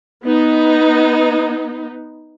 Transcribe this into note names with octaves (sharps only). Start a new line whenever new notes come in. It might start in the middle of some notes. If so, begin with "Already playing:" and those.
B3 D#4